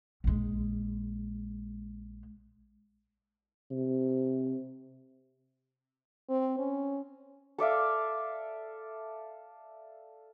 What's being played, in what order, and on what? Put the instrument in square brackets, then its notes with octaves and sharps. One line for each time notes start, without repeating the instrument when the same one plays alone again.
[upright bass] A#1 G#3
[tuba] C3
[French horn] C4
C#4
[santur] A4 D5 E5 F5